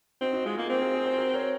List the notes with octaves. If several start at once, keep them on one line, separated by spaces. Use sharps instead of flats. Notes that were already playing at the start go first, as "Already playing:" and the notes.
C4 D#4 F#4
D#4 F#4
G#3 F4 G#4
A#3 F#4 A#4
C4
F#4 A#4
G#4 C5
G#4 C5
F#4 A#4
A#4 C#5